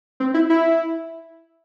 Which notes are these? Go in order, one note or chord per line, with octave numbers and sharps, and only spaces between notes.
C4
E4
E4